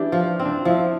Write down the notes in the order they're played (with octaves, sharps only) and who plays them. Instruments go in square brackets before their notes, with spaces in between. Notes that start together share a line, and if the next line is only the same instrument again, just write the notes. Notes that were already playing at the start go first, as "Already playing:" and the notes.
Already playing: [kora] E3 G4 [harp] D4 E4
[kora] F3
C4
[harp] D4
[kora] F3 [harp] E4